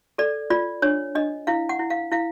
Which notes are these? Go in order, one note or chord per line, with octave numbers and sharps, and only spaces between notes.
A4 D5
F4 D5
D4 C#5
D4 D#5
E4 F5
F#5
E4
F5
E4 F5